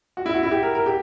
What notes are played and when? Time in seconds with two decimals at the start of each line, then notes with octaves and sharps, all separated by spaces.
0.17 F#4
0.26 E4
0.34 F#4
0.43 E4
0.51 G4
0.63 A#4
0.75 A#4
0.86 G4